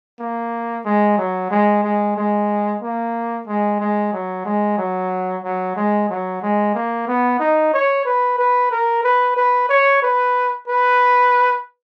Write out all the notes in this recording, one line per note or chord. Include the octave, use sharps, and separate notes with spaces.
A#3
G#3
F#3
G#3
G#3
G#3
A#3
G#3
G#3
F#3
G#3
F#3
F#3
G#3
F#3
G#3
A#3
B3
D#4
C#5
B4
B4
A#4
B4
B4
C#5
B4
B4